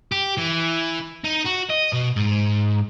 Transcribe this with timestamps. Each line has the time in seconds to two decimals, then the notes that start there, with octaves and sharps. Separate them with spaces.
0.12 G4
0.38 E3
1.24 D#4
1.45 F#4
1.70 D#5
1.93 B2
2.16 G#2